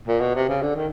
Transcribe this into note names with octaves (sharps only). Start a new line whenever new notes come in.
A#2
B2
C3
C#3
D3
D#3